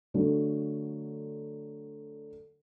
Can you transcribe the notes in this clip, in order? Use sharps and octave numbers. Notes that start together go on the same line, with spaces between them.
D3 F#3 A3